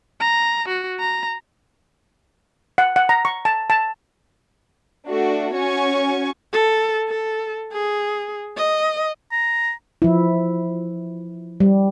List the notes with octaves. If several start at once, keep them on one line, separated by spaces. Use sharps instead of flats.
A#5
F#4
A#5
F#5
F#5
A#5
C#6
A5
A5
A3 D4 F#4
C#4 F#4 C#5 G#5 C#6
A4
A4
G#4
D#5
A#5
F3 E4
G3